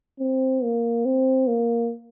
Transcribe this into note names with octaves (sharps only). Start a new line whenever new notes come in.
C4
A#3
C4
A#3